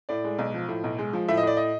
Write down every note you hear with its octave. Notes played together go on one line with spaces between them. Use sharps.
A2 D5
G#3
B1
F3
A2
B1
G#3
F3
A2 E5
D#5
A2 D5
D#5